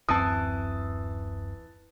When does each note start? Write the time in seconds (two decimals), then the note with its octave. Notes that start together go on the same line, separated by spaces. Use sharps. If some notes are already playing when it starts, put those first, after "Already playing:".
0.09 D1 F#2 E3 C4 A5 D#6